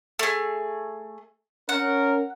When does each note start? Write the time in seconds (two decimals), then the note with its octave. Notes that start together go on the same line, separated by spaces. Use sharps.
0.19 A3 G#4
1.69 C#4 A#4 F#5